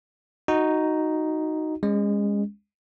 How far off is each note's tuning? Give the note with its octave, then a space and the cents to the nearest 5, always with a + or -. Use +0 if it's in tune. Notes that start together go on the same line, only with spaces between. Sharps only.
D#4 +0 F#4 +0
G#3 -25 C#4 +0